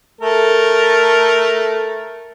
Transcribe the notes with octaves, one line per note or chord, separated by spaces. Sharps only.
A3 A4 A#4